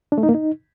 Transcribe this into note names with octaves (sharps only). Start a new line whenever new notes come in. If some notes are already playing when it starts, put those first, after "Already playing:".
D4
A3
D#4
A#3
D#4